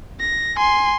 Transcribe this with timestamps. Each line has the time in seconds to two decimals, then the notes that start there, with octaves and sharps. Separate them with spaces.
0.20 A#6
0.57 G#5 C6